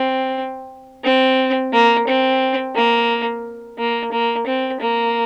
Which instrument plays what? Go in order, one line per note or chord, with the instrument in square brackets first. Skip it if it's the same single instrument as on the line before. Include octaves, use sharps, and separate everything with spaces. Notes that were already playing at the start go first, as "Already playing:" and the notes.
Already playing: [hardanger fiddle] C4
C4
A#3
C4
A#3
A#3
A#3
C4
A#3